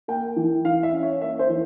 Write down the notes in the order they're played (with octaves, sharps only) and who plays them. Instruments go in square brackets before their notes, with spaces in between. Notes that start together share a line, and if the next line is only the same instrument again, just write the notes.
[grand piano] A#3 G5
E3
E3 F5
E5
C#4
C#5
A#3 E5
C5
E3